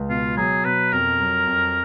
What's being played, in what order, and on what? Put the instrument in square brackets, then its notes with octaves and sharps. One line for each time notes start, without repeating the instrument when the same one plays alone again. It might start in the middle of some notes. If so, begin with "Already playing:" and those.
Already playing: [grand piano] C#2
[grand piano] B2 [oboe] F4
[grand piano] F#3 [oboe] G#4
[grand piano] B2 [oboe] B4
[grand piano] F2 [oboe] A#4
[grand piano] F#3
F2